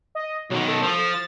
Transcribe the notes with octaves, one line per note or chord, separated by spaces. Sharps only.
D#5
B1 D#3 F#3
A4
F3
A6